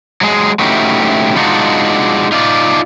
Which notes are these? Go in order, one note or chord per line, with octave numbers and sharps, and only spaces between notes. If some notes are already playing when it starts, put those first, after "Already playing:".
F#3 G#3 G#4
A3 C#4 D#4 E4 F#4 G4
G#3 D4 D#4 F4 F#4
D#4 F4 D5